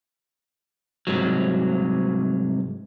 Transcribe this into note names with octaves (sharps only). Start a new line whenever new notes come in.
C2 G#2 F#3